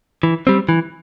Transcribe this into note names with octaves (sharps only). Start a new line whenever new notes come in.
E3
G3 C4
E3